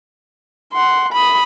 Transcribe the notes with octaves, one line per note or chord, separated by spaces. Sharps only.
F#5 C6
B5 D#6